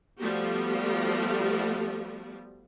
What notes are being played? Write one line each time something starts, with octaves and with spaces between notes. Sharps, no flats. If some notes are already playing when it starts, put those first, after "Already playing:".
F3 G3 A3 B3 F#4 G4